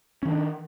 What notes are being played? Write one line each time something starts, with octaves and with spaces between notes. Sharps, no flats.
D#3 C#4 D4